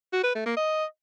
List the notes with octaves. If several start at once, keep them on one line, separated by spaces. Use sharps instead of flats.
F#4
B4
A3
A#3
D#5